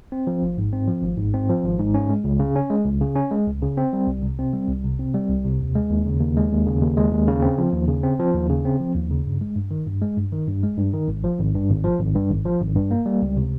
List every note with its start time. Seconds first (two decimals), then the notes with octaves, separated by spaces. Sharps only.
0.12 C4
0.27 F3
0.42 G#1
0.58 G#2
0.73 C4
0.88 F3
1.02 G#1
1.18 G#2
1.34 C4
1.49 F3
1.63 G#1
1.79 G#2
1.94 C#4
2.09 G#3
2.24 C#2
2.40 C#3
2.56 C#4
2.70 G#3
2.85 C#2
3.01 C#3
3.16 C#4
3.31 G#3
3.47 C#2
3.62 C#3
3.77 C4
3.93 G3
4.07 C2
4.22 C3
4.39 C4
4.53 G3
4.68 C2
4.84 C3
4.99 C4
5.15 G3
5.29 C2
5.45 C3
5.60 D#2
5.75 G#3
5.90 D#2
6.06 C#3
6.20 D#2
6.37 G#3
6.52 D#2
6.66 C#3
6.82 D#2
6.97 G#3
7.13 D#2
7.27 C#3
7.42 C4
7.58 F3
7.73 D#2
7.88 C#3
8.03 C4
8.20 F3
8.35 D#2
8.50 C#3
8.65 C4
8.80 F3
8.95 D#2
9.11 C#3
9.26 G2
9.41 G#3
9.55 G2
9.71 D#3
9.87 G2
10.02 G#3
10.18 G2
10.32 D#3
10.47 G2
10.63 G#3
10.77 G2
10.93 D#3
11.08 G#1
11.24 F3
11.38 G#1
11.55 G2
11.70 G#1
11.84 F3
11.99 G#1
12.15 G2
12.31 G#1
12.45 F3
12.61 G#1
12.75 G2
12.91 A#3
13.06 G3
13.22 C#2
13.37 C3